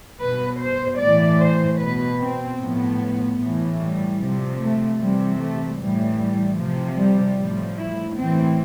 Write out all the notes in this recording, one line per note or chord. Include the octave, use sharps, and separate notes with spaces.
B2 B4
C5
A2 E3 D5
C5
B2 B4
C4
A2 F3 B3
A2 E3
G3
C3 F3
A3
C3 E3 G3
A3
A2 E3 G3
C3 F3
G3
A2 F3
E4
A2 E3 C4